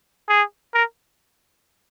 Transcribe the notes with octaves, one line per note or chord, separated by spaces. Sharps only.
G#4
A#4